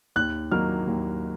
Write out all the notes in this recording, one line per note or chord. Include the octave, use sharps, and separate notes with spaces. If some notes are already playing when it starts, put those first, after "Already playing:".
D#2 F#6
D#3 F#3 A#3 F6
D#2